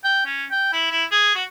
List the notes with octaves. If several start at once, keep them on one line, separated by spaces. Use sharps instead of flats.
G5
C#4
G5
E4
E4
G#4
F#4